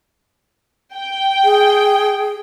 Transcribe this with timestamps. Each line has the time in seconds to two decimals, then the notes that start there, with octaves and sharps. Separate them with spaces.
0.95 G5
1.44 G#4